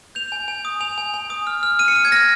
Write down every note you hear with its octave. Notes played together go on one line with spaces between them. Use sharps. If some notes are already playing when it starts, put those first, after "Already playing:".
G6 F7
G#5
G#5
D#6
G#5 F7
G#5
G#5
D#6
F6
F6
F6 D#7
C#7
F6
G#6
F6 A#6